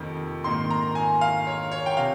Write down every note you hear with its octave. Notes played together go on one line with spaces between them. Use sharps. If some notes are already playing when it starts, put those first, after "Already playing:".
Already playing: F1 F2 D#3 A#3
A#1 G#2 D#3 A#3 C6
A#5
G#5
F5
C#5
C#5
G5
C3 F5